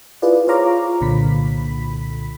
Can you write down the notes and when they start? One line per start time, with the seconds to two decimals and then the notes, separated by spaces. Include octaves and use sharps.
0.22 E4 F4 G#4 B4 D5
0.47 F4 C5 C#5 F5 A#5 D6
1.01 C2 A#2 D3 B5 B6